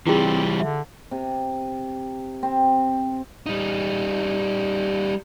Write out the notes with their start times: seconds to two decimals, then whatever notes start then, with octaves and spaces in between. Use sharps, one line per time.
0.07 E3 G3 C4 E4 F4 G#4
0.60 D3 E5
1.11 C3
2.43 C4
3.46 G3 D#4